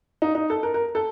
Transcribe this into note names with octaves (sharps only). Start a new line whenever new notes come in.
D#4
D#4
A4
A#4
A#4
A4